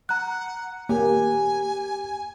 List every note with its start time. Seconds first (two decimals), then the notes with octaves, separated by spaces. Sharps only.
0.09 F#5 A#5 F#6
0.89 A#3 G4 G#5